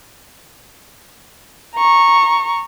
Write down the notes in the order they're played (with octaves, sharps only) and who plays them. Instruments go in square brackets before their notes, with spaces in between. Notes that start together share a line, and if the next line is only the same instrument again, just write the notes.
[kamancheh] A#5 C#6